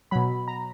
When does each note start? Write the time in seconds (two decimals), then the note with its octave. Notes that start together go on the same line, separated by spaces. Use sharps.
0.11 B2 F#3 B5
0.48 A#5